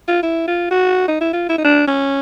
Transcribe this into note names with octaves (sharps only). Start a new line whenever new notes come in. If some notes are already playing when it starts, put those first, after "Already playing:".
F4
E4
F4
F#4
D#4
E4
F4
E4
D#4
D4
C#4